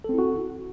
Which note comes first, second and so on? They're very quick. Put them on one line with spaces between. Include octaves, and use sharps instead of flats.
A4 C4 E4 F#4